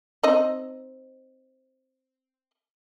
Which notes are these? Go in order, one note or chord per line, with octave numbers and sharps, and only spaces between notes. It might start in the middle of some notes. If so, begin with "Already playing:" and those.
C4 D#4 D#5